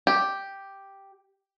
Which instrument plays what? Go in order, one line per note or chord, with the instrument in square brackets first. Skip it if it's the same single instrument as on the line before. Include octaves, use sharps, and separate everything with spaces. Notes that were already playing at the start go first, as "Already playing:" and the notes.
[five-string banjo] G4